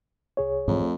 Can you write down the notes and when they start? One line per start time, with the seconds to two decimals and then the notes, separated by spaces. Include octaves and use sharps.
0.37 C2 G#4 C#5
0.68 F2 G#2 E3 A3
0.81 A3